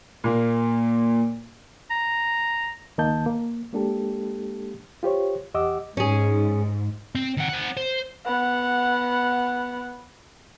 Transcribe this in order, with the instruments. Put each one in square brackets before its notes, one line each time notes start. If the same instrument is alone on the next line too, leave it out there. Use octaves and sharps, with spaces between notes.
[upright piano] A#2 A#3
[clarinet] A#5
[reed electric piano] C#2 D#3 A#3 D#5 A5 G6
A#3
G#3 A#3 D4 G4 A4
F4 G4 C5 C#5
E2 G4 D#5 F#5 D6 E6
[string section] G#2 [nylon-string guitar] C#4 G#4
[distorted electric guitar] C4
D#3 F#5
C4 F#5
C5
[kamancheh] B3 F#5